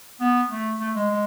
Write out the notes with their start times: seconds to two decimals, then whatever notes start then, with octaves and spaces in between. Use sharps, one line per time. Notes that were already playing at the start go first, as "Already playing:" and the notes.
0.21 B3
0.51 A3
0.80 A3
0.95 G#3
1.11 G#3